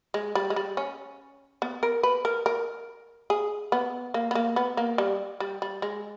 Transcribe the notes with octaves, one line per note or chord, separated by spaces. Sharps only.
G#3
G3
G#3
G3
C#4
B3
A#4
B4
A#4
A#4
G#4
B3
A#3
B3
A#3
B3
A#3
G3
G3
G3
G#3